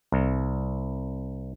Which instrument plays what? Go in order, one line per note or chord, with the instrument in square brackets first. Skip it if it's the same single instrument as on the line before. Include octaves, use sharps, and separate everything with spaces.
[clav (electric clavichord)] C2